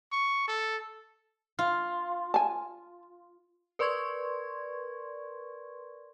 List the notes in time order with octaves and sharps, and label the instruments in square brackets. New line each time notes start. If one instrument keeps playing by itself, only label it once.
[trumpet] C#6
A4
[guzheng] F4
[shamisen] G#5 A5
[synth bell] A#4 B4 D5 C6 C#6 G#6